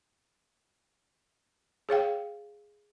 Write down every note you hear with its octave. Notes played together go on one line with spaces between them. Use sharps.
G#4 C#5 F5 G5